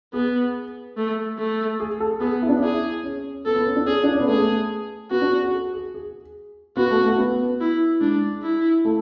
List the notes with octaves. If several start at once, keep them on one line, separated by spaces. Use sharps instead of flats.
B3 G#4
A3
A3
G#4
A4
B3 G#4
E4
D4
E4
G#4
C#4
B3 A4
B3
C#4
D4
C#4 G#4
D4
C#4
B3
A3 G#4
B3 F#4
D4
G#4
A4
G#4
G#4
B3 F#4
A3
A3
B3
E4
G#3 D4
E4
A3